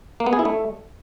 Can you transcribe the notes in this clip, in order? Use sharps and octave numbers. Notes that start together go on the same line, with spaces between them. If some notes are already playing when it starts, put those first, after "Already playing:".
A#3
B3
G#4
E4
A3